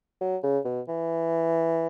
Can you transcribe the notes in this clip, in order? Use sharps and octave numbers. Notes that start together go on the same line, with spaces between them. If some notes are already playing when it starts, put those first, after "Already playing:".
F#3
C#3
B2
E3